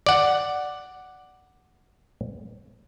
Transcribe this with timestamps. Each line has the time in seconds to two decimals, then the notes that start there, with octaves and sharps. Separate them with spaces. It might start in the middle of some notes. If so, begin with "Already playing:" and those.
0.06 D5 F#5